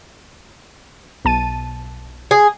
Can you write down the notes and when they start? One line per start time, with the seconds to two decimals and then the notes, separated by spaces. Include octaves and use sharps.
1.25 B1 A5 D#7
2.31 G#4